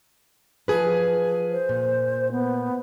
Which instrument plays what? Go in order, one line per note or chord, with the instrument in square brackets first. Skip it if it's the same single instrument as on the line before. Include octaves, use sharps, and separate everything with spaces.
[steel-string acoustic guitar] F3 G#4 B4
[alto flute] C5
[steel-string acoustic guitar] A#2
[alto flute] B3